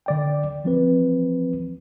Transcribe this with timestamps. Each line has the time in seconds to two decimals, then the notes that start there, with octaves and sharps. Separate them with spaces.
0.06 D3 D5 G5
0.64 E3 F3 C4 B4